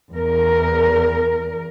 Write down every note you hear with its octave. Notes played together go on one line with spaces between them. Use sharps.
E2 A#4